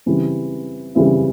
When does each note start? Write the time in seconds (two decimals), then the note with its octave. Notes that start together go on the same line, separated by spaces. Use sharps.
0.06 C#3 E3 G3 C4 E4
0.95 C#3 E3 G3 C4 E4